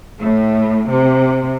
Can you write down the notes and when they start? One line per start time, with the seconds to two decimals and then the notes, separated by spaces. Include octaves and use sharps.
0.19 A2 A3
0.88 C3